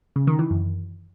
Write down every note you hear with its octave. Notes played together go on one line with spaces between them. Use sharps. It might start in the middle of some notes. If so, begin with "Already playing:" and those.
C#3
D#3
E3
F#2